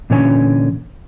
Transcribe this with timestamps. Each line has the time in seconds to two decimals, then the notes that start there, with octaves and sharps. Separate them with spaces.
0.10 A#2 D3 E3 C#4 C#5 G#5